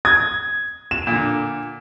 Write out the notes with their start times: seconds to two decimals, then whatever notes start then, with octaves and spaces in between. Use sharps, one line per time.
0.05 D#6 G#6
0.91 E7
1.07 A#2 D3